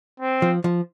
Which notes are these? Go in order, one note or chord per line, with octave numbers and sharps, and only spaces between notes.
C4
F3
F3